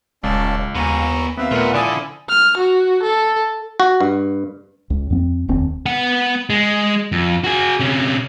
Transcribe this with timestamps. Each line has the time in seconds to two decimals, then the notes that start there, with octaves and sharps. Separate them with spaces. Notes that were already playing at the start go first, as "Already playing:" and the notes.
0.24 D#1 C#2 C#4 D5 A5
0.75 D#2 B3 G#5 A#5 C#6
1.37 D#2 B3 C4 B4 E5 F5
1.51 A#2 A3 B3 F4 A#4 F#5
1.74 D3 F3 E4 A4 D5 G#5 D#6
2.29 F6
2.58 F#4
3.03 A4
3.80 F#4
4.00 G2
4.90 C#2
5.10 F2 B3 C4
5.49 F1 D#2 C4
5.86 B3 F#5
6.50 G#3
7.12 F2
7.44 F#4 G#4
7.80 C3 C#4